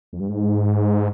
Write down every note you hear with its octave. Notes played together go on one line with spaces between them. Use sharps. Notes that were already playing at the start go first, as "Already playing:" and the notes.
F2
G2
G#2